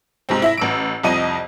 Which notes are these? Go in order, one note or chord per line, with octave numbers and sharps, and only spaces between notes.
G#2 C3 C4
E4 E5 A#6
A1 E6 D7
C2 F2 D#5 D#7